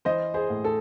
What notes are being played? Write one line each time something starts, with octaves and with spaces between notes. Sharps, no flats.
E3 C5 D#5
G#4 C5
A2
A4